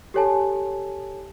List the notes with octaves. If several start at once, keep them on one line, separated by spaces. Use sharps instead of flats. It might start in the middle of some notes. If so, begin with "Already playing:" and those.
G4 A4 C#5 G#5 A5